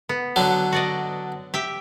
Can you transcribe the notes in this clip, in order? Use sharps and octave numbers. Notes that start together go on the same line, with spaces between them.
B3
D3 F#3
F#4 D5 D#5
G4 E5 G5